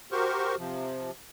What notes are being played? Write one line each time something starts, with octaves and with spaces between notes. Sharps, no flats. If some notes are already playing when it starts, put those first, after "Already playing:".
F#4 G4 A#4 C5 C#6
C3 F3